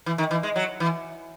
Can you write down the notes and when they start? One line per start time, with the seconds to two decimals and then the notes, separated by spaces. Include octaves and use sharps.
0.06 E3
0.18 D#3
0.31 E3
0.43 G#3
0.56 F#3
0.80 E3